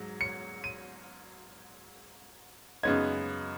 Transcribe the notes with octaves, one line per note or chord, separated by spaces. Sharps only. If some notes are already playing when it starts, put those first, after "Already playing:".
Already playing: G#2 F#3
C#7
D#7
F#2 C#3 G#3 B3 D#4 G#6